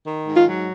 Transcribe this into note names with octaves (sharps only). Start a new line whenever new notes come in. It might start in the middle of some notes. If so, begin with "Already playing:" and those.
D#3
G#2
F4
F#3